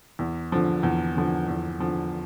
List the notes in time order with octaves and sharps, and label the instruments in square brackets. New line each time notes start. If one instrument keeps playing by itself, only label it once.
[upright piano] E2
D3 F3
E2
D3 F3
E2
D3 F3